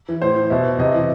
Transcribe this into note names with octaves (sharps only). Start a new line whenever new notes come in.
E3
A2 C5
E3
B2 E5
C3 D#5
E3